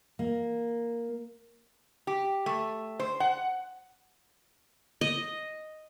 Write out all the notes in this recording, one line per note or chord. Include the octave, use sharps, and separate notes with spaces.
A#3
G4
A3
C5
F#5
D#5